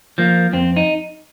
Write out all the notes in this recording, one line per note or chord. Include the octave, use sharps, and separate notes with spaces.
F3 A#3
F2 C4
D#4